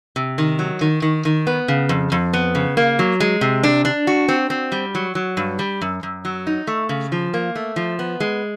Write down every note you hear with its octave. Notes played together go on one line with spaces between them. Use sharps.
C3
D#3
F#3
D#3
D#3
D#3
B3
C#3
F2
F2
B3
C#3
A#3
F#3
G#3
C3
D4
D4
F#4
C4
C4
G3
F#3
F#3
G2
G3
F#2
F#2
F#3
D#4
A3
C#3
F3
A#3
A3
F3
B3
G#3